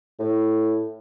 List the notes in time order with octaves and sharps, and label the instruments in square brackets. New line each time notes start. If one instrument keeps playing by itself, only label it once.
[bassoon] A2